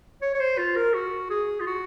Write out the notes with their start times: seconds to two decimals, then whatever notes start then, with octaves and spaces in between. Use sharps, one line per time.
0.22 C#5
0.35 C#5
0.40 C5
0.58 F4
0.76 A#4
0.94 F#4
1.30 G#4
1.60 F4
1.66 F#4